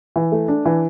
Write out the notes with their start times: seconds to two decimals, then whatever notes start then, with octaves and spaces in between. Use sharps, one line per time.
0.16 E3
0.32 A3
0.48 D4
0.66 E3